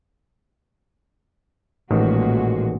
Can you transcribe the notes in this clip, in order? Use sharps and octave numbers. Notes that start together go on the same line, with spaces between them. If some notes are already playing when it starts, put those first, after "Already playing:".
A1 A#2 D#3 G#3 F#4